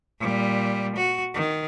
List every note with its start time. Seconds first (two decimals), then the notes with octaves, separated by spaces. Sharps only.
0.20 A#2 G3
0.96 F#4
1.34 D#3